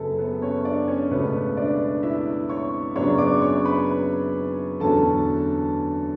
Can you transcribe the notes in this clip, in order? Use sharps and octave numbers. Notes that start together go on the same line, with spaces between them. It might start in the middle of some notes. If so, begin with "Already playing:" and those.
Already playing: F#1 F#2 C#3 A4 B4 A5
B3 B4
C#4 C#5
D4 D5
C#4 C#5
C#2 B2 A3 B3 C#4 B4
D4 D5
E4 E5
C#5 C#6
F#2 C#3 F#3 B3 D4 C#5 C#6
D5 D6
C#5 C#6
B4 B5
E2 D3 F#3 C#4 A4 A5